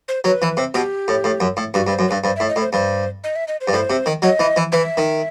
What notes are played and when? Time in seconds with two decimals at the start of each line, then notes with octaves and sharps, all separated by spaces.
0.08 C5
0.24 F#3 B4
0.42 E3
0.57 C3
0.74 B2 G4
1.08 A2
1.24 A2
1.40 F#2
1.57 A2
1.74 G2 F#4
1.87 G2
1.91 C5
1.99 F#2
2.08 G2 B4
2.24 G2 C5
2.36 E5
2.40 A2
2.48 D#5
2.56 A2
2.61 C5
2.73 G2 C5
3.24 D#5
3.36 E5
3.48 D#5
3.61 C5
3.68 G2
3.73 A2 C5
3.90 C3
4.06 D#3
4.22 F#3 D#5
4.39 E3
4.56 E3
4.72 E3 E5
4.97 D#3